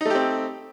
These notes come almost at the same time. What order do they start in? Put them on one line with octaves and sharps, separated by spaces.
D#4 A3 G4 C4